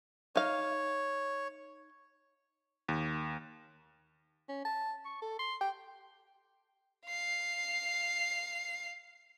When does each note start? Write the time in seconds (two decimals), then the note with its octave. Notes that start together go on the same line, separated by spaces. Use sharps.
0.36 D#4 C#5 F5
2.88 D#2
4.49 C#4
4.65 A5
5.05 C#6
5.22 A4
5.39 C6
5.61 G5
7.07 F5 C7